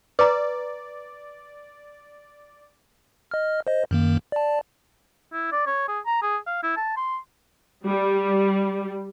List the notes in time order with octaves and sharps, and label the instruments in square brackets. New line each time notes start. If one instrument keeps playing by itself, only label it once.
[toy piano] B4 A#5 [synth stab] D5
[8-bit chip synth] D#5 F6
C5 D#5
F#2 D#3 A#3
D5 A5
[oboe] E4
D5
C#5
G#4
A#5
G#4
F5
E4
A5
C6
[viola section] G3